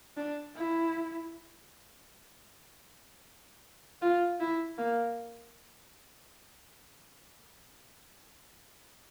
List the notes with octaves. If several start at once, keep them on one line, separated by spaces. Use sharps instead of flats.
D4
E4
F4
E4
A#3